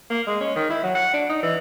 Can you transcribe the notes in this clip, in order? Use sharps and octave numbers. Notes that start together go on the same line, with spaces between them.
A#3
G#3
C#4
D#3
E4
F#3
F#5
D4
D#4
E3